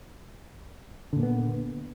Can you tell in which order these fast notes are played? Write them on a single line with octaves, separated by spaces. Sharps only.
D3 A#2 A#3 B3